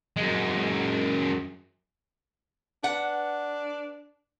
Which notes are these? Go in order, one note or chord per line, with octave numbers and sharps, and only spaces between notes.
F#2 G#3
D4 B4 F#5